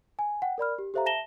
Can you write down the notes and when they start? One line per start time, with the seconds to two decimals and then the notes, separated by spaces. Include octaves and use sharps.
0.19 G#5
0.42 F#5 G5
0.58 A#4 D5 B5 F6
0.79 G4
0.94 G4 A4 C5 E5 F5 A#5
1.06 E5 A5 A#6 E7 G7